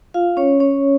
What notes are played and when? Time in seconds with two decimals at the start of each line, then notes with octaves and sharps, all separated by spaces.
0.14 F4 F5
0.37 C#4 C#5
0.60 C#4 C#5